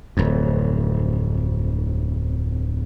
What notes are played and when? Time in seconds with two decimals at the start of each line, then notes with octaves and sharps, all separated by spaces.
0.17 D1 F2